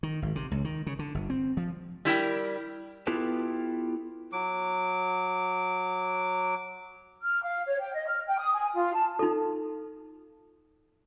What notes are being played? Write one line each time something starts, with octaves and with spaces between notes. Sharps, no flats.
D#3
G#1
C3
C#2
D#3
C#3
D3
G1
C4
F3
G3 E4 A#4 G5
B3 E4 F4 G4 A4 B4
F#3 D6
F6
F5
C#5
G5
D#5
F6
G5
D#6
G#5
F4
A5
D#4 F4 A4